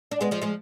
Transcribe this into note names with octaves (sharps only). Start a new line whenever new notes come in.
D4
G#3 B3
F3 G#3
F3 G#3